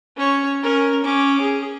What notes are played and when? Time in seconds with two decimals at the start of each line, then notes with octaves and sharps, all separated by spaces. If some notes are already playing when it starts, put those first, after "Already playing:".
0.17 C#4 C#5
0.63 C#4 A#4
1.04 C#4 D6
1.41 G#4